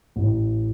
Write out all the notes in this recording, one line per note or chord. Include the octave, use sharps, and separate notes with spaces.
A1